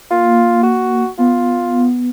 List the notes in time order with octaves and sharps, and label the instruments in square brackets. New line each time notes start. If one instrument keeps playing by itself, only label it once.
[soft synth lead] A#3 [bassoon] F4
[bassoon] F#4
[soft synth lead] B3 [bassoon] F4